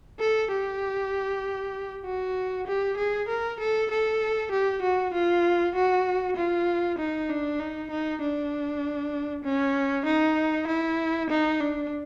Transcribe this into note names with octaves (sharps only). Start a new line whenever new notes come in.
A4
G4
F#4
G4
G#4
A#4
A4
A4
G4
F#4
F4
F#4
F4
D#4
D4
D#4
D#4
D4
C#4
D#4
E4
D#4
D4